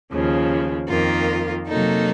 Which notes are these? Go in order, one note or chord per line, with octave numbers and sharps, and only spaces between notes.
D#2 C#3 F3
F2 D#3 A#3 F4
C3 F#3 A#3 D#4 A4